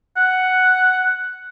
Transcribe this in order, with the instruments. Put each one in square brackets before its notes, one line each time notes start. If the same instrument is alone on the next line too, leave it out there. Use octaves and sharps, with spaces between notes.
[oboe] F#5